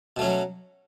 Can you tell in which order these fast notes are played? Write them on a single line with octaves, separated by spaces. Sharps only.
B2 A3 C#4 F#3